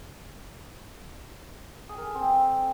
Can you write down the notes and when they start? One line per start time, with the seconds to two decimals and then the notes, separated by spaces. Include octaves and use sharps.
1.89 G#4
1.98 A#4
2.06 A4
2.15 C4